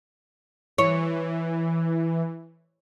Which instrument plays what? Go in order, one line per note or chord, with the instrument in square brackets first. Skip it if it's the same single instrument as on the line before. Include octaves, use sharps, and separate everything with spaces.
[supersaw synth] E3 [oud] C#5